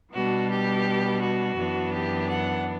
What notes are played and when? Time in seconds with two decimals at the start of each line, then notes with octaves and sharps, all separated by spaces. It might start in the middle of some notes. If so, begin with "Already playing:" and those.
0.13 B2 G3 B3 D4 F#4
0.49 G4
1.21 F#4
1.57 F#2 E3 B3 D4
1.92 G4
2.29 F#5